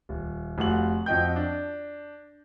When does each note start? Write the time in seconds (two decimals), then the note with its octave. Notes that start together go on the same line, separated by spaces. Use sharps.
0.09 D#1
0.58 F1 F4 F#4 F#7
1.06 F2 F#4 D#5 G5 G6
1.36 D4